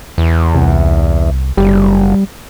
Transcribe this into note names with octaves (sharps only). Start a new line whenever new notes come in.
E2
C2
F#1 G3